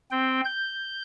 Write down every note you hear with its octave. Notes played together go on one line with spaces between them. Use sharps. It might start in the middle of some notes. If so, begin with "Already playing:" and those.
C4 G5
G6